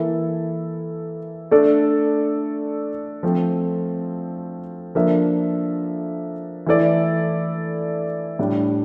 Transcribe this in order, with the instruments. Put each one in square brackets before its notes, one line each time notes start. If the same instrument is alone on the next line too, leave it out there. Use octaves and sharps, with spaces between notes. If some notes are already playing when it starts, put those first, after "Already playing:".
Already playing: [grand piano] E3 A#3 E4 A4
A3 D4 A4 D5
F3 A3 C4
F3 A#3 D4 A4 E5
E3 A3 E4 A4 D5
A2 G3 D4